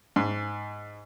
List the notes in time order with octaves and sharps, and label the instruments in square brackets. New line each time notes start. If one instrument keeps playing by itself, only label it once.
[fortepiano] G#2